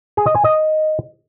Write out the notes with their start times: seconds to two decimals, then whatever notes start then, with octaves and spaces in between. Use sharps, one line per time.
0.17 G#4
0.26 D#5
0.35 G#5
0.44 D#5